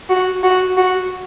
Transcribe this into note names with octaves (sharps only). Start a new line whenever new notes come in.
F#4
F#4
F#4